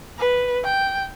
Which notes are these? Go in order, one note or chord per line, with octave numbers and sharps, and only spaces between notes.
B4
G5